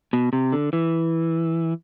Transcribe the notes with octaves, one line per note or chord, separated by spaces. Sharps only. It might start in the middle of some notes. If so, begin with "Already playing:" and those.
B2
C3
D3
E3